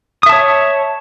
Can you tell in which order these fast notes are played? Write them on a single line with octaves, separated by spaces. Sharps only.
D#6 E5 A5 C#5